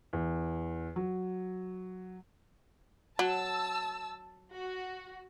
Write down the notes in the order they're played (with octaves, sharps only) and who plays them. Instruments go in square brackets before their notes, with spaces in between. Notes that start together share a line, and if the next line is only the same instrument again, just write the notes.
[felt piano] E2
F#3
[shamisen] F#3 [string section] A5 E6
[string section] F#4